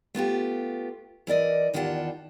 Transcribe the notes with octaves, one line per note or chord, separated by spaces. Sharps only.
A3 B3 F4 G4
E3 A#4 D5 D#5
E2 D#3 F4 G4 F#5 A5